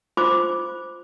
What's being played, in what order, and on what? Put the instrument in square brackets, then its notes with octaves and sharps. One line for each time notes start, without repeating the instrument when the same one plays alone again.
[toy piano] F4 C5 D6